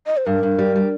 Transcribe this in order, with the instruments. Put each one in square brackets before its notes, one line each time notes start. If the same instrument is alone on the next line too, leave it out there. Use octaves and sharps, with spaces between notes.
[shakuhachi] D#5
C5
[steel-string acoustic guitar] G2 [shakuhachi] A#4
[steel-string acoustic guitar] G2
G3
G3